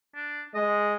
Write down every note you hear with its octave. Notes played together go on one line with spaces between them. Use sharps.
D4
G#3 D#5